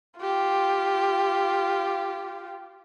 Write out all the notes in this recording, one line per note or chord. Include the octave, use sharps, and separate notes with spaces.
F4 G4